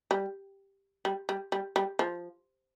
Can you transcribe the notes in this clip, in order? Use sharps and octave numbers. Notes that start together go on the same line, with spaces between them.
G3
G3
G3
G3
G3
F3